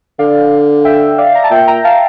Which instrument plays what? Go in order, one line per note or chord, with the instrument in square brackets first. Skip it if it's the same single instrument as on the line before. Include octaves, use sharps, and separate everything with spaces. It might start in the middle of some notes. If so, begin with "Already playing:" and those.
[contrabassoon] D3 [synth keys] D5 F5
[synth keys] E5 G5
D5 F5
A#5
A5
[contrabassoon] A#2 [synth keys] E5 G5
[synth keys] G5 A#5
F5 A5